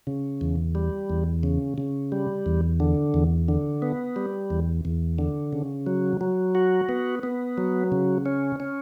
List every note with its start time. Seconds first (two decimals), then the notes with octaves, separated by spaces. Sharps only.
0.07 C#3
0.41 E2
0.75 G3
1.09 E2
1.43 C#3
1.78 C#3
2.12 G3
2.46 E2
2.80 D3
3.14 E2
3.48 D3
3.82 B3
4.16 G3
4.50 E2
4.85 E2
5.19 D3
5.53 C#3
5.87 F#3
6.21 F#3
6.55 F#4
6.89 B3
7.23 B3
7.58 F#3
7.92 C#3
8.26 C#4
8.60 C#4